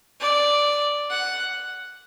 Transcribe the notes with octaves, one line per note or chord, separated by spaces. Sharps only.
D5
F#5